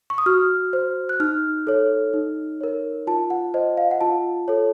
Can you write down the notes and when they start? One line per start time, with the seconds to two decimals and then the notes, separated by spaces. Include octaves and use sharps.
0.10 C#6
0.18 D#6
0.26 F#4 F6
0.73 C5
1.09 F#6
1.20 D#4 F6
1.67 A4 C#5
2.13 D#4
2.61 A#4 C#5
3.07 F4 A5
3.30 F#5
3.54 C5 D#5
3.77 F5
3.91 F#5
4.01 F4 A5
4.48 A4 C#5